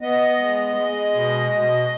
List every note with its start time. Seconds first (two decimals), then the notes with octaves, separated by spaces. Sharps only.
0.01 B3 D#5
0.40 G#3
0.76 G#3
1.14 B2
1.51 B2